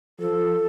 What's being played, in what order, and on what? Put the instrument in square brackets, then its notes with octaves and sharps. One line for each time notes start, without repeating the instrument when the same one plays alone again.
[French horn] F3 [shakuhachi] A4